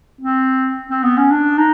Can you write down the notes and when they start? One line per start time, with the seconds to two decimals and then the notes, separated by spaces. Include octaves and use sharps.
0.21 C4
0.90 C4
1.03 B3
1.17 C#4
1.31 D4
1.58 D#4